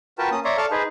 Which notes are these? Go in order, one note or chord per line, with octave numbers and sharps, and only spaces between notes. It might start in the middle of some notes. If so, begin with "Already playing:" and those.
F4 F#4 A#4 B4 G5 A5
A#3 C#4 D#6
C#5 D5 E5 A#5 C6
A4 D5 F5 A5 C#6 F6
D#4 G#4 B4 C5